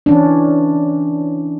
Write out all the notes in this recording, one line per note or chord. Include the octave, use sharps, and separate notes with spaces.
E3 C#4 D4